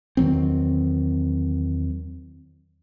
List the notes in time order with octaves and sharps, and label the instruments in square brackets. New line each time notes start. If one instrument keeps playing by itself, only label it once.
[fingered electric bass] E2 D#3 F#3 C4